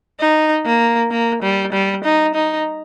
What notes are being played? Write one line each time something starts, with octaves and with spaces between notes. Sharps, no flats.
D#4
A#3
A#3
G3
G3
D#4
D#4